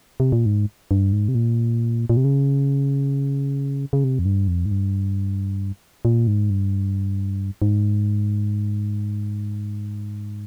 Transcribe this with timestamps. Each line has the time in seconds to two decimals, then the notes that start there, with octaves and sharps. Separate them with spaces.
0.20 C3
0.32 A#2
0.46 G#2
0.91 G2
1.13 G#2
1.28 C3
1.35 A#2
2.10 A#2
2.17 C3
2.24 C#3
3.93 C#3
4.04 C3
4.19 F2
4.25 G2
4.48 F2
4.66 G#2
4.71 G2
6.05 A#2
6.27 G#2
6.50 G2
7.62 G#2